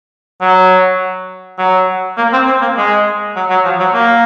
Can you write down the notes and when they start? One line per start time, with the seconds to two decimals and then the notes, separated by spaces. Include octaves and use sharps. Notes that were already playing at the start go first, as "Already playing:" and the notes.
0.41 F#3
1.59 F#3
2.18 A#3
2.33 C4
2.47 C4
2.61 A#3
2.77 G#3
3.36 F#3
3.50 F#3
3.65 F3
3.80 F#3
3.94 A#3